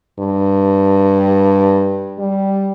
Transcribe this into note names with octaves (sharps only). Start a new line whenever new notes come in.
G2
G3